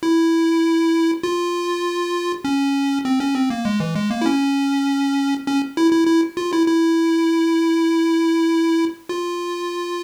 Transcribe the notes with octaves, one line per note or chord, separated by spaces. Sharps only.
E4
F4
C#4
C4
C#4
C4
A#3
G#3
E3
G#3
A#3
E4
C#4
C#4
E4
E4
E4
F4
E4
E4
F4